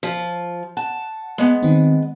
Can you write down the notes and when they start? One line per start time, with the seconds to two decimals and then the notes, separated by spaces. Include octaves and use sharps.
0.03 F3
0.77 F#5 A5
1.38 G#3 B3
1.63 D#3 C4